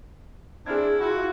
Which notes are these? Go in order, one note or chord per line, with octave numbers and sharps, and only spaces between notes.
C4 D4 E4 G#4 F6 G#6
F4 F#4